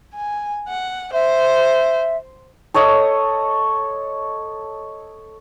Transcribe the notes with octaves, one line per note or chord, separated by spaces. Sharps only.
G#5
F#5
C5 E5
A4 C#5 D#5 D#6